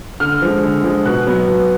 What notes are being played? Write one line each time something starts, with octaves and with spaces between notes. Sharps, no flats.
D3 F6
F3 G#3
D3
F3 G#3
B2 F#6
F#3 B3
B2